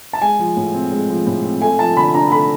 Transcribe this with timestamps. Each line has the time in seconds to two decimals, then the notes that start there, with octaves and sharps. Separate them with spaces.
0.13 A5
0.22 G#3 G#5
0.39 F3
0.57 A2
0.74 C4
0.92 G#3
1.10 F3
1.27 A2
1.45 C4
1.61 A3 G#5
1.79 F3 A5
1.97 D3 B5
2.14 D4 A#5
2.32 A3 B5